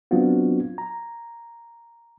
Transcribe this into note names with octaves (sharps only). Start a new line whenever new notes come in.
F#3 B3 C4 D4 F4 F#4
A#5